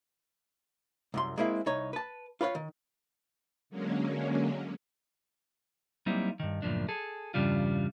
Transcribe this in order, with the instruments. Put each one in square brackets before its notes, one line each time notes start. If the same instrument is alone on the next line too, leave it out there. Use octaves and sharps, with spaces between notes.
[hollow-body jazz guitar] C2 F#2 C6
G#3 A#3 C4 E4 E5
C2 D#4 C#5
B4 A5
F4 B4 C#5 F5
D#3
[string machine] D3 F#3 G#3 A#3 C#4
[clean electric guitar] F#3 G3 A#3 C4 D#4 E4
G2 D#3
C#2 F#2 A2 F3 A#3 D4
G#4 A4
E2 G2 C#3 G3 D4 F4